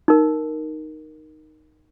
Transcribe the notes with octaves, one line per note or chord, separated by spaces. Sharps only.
D#4 A#4